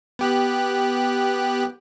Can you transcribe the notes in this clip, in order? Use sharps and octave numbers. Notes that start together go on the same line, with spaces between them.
B3 G4 F#6